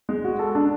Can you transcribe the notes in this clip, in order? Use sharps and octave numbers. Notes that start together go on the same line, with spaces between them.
G#3
F#4
A4
D4